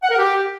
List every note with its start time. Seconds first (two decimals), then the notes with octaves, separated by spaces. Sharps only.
0.03 F#5
0.11 A#4
0.18 G4